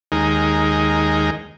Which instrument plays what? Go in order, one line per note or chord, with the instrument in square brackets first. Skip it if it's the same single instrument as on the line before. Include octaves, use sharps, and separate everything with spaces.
[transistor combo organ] D#2 G#3 D#4 A#4